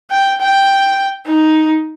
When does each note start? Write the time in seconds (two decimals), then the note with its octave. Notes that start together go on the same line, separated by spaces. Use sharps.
0.11 G5
0.40 G5
1.26 D#4